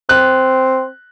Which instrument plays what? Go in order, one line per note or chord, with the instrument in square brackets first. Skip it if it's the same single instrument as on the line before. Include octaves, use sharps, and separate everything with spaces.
[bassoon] C4 [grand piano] F#6